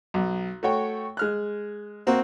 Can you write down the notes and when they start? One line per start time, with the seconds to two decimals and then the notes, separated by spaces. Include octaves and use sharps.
0.14 B1
0.63 A3 F#4 C#5 G5
1.17 G#3 F6 F#6
2.07 A#3 C4 F#4